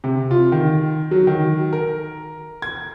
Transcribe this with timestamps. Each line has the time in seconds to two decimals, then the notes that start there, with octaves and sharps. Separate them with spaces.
0.04 C3
0.31 F4
0.52 D#3
1.11 F#3
1.27 D#3
1.73 A#4
2.62 G#6